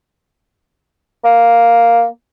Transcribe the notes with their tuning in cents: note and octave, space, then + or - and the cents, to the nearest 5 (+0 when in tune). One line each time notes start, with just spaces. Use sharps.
A#3 +0